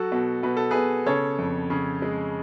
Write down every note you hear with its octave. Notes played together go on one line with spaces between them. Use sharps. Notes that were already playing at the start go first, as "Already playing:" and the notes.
Already playing: F#3 F#4 A4
B2
B2 B4
A4
B2 G#4 B4
C#3 A4 C#5
F2
C#3
G#3